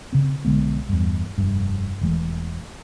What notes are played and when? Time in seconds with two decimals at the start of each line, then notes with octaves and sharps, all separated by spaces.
0.13 C#3 C4
0.45 B1 D3 G#3 B3
0.89 E2 G2
1.38 F1 G2
2.01 E1 E3 A3